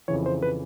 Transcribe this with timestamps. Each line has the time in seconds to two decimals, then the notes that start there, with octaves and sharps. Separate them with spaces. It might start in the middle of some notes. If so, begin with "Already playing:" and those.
0.08 F2 C#3 E3 C#5
0.26 C5
0.42 B4